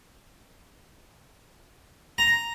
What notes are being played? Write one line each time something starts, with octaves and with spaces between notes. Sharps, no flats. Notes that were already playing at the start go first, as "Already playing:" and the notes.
A#5